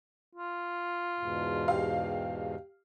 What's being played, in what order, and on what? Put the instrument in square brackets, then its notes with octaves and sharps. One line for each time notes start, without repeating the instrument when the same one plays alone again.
[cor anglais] F4
[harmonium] E2 G#2 B2
[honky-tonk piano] G4 F5